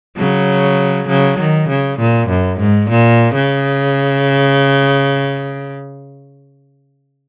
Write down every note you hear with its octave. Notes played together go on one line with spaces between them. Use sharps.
C#3 F#3
C#3 F#3
D#3
C#3
A#2
F#2
G#2
A#2
C#3